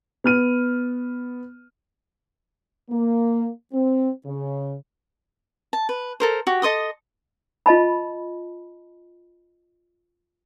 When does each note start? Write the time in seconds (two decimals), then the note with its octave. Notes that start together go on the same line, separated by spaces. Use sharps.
0.24 B3 F6 D#7
2.90 A#3
3.73 C4
4.25 C#3
5.73 A5
5.89 B4
6.20 A4 A#4 C5
6.47 F#4 G4
6.62 A4 D#5 C6 D#6
7.66 F4 D#5 A5 B5